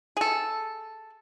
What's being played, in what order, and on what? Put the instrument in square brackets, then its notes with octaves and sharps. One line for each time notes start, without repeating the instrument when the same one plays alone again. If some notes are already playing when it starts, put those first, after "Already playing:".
[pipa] G#4 A4